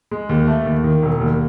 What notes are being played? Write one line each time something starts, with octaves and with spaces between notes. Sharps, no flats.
G#3
D#2
A3
D#2
D#3
E1
D#2